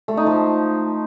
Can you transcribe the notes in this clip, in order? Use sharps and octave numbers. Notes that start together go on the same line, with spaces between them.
A3
D#4
F3